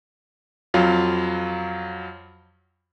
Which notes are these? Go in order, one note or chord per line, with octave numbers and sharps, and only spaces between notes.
F2 F#3 F4 F5